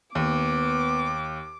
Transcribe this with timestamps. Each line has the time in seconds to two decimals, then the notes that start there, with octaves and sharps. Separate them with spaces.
0.15 D#2 B3 D6